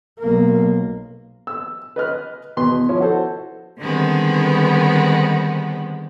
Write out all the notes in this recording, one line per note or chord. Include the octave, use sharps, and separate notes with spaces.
B1 A#3
E6
B4 D#5 F6 F#6
E2 B2 B4 C6
F3 C#4 E4
F#4 A4 C5
D3 D#3 G3 G#3 B3 C4